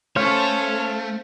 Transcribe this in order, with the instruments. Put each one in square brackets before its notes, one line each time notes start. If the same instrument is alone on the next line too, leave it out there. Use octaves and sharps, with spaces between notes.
[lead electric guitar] A3 [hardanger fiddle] C#4 A4 [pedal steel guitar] C5 F5 [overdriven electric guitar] C#5